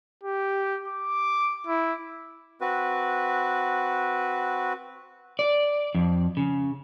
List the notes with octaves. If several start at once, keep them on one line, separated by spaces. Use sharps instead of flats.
G4
D6
E4
C4 F#4 B4
D5
F2
C#3